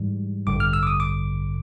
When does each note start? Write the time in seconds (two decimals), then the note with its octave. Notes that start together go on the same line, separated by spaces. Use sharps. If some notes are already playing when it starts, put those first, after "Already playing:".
Already playing: G#2 E3 G3
0.47 A1 G2 D3 D6
0.60 F6
0.73 E6
0.83 D6
0.87 D#6
1.00 D6